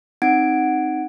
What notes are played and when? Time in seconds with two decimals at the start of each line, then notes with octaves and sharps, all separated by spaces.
0.22 C4 D#4 F#5 G#6 D7